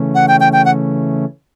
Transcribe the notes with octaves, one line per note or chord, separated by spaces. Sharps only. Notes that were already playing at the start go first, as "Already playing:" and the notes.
Already playing: C#3 E3 A3 C#4
F#5
G5
G5
G5
F#5